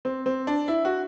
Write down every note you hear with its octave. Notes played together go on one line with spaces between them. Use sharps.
C4
C4
D4
E4
F#4